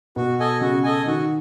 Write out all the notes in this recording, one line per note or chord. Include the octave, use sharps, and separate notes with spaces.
B2 F#4
A4 D#5 G#5
C#3 F#4
A4 D#5 G#5
D#3 F#4